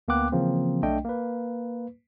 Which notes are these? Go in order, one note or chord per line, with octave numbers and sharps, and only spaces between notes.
D2 A#3 B3 G5 D6 F#6
C#3 E3 F3 A#3 C4
B1 A3 D4 D#5 G5
A#3 B4